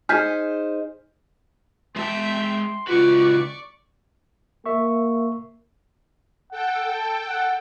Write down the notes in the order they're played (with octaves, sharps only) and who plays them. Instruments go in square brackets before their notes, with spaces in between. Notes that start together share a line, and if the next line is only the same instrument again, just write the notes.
[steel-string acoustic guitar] D#4 C5 [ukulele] G#4 [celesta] F6 G6 B6
[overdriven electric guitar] G#3 A5 [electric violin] E5 G5 [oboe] C6
[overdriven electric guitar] C#2 F#4 [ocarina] F4 [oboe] B4 [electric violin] D5 C#6
[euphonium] A#3 [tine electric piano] E5 C#6
[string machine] A4 G5 [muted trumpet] F#5
[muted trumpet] A5
F#5